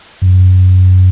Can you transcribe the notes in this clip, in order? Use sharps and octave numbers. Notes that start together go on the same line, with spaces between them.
F#2